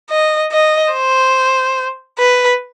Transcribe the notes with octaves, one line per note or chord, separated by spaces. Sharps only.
D#5
D#5
C5
B4